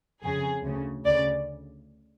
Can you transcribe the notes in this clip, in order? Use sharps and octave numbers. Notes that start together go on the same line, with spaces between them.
F2 C#3 G#4
D2 C#3
D2 C#3 D5